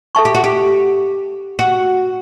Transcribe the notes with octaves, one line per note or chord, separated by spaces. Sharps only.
A4 E5 A5 C#6
G4
F#4
G4
F#4